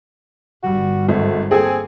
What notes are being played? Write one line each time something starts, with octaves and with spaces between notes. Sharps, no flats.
G1 G3 F#4
G#1 A3
A#3 C4 G#4 A4 G#5